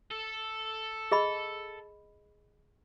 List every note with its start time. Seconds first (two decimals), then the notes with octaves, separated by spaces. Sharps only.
0.11 A4
1.12 G#4 D#5 B5